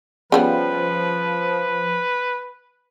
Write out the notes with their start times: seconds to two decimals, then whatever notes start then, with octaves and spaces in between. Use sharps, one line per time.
0.32 C#3 F3 G3 B3 B4